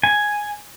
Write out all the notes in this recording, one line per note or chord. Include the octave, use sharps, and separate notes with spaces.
G#5